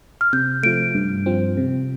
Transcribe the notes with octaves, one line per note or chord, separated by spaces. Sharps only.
F6
C3 G6
F3 A3 D7
G2
F3 C4
C3